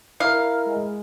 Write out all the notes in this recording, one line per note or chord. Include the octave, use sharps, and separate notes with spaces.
E4 A#4 F5
G#3